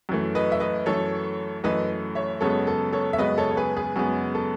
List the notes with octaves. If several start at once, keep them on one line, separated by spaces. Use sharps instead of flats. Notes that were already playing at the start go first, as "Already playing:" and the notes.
F#2 E3 A3
B4 D#5
E5
B4 D#5
F#2 E3 A3 A4 C#5
F#2 E3 A3 B4 D#5
C#5 E5
F#2 C#3 G#3 B3 A4 C#5
A4
A4 C#5
E5
F#2 C#3 G#3 B3 B4 D#5
A4 C#5
C#5
G#4 B4
G#4 B4
F#2 C#3 G#3 B3 G#4
A4